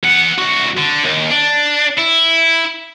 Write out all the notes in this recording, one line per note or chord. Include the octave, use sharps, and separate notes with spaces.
E3 F#5
C2 F#4
D3
D#2
D4
E4